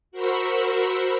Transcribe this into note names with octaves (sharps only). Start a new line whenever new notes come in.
F#4 A#4 C5 B5 C#6 E6